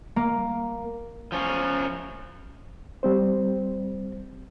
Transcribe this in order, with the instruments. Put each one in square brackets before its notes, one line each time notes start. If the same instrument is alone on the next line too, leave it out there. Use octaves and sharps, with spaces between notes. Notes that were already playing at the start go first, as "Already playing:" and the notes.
[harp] A#3
[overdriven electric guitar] F3 C#4
[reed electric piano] G3 C4 C5